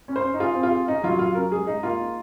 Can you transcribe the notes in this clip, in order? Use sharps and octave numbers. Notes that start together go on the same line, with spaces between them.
C#4
C5
C#4
D#4
F4 G#4
C4
F4
G#4
C#4 D#4
F#3 F4
F#3 F4
C#4 A#4
G#3 G#4
G#3 D#4
A#3 F4
D#4